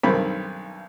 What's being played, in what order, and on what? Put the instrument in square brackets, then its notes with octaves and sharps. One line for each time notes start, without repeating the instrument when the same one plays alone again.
[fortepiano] B1 G2 D#3 C4 B5